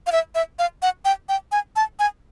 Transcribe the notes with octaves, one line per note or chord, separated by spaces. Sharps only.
F5
E5
E5
F5
F#5
G5
G5
G#5
A5
G#5